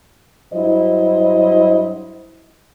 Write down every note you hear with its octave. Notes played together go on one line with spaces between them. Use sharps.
G2 F#3 E4 C5 D#5